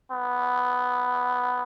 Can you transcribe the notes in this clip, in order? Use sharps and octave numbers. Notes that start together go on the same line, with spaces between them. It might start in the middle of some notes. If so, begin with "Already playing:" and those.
B3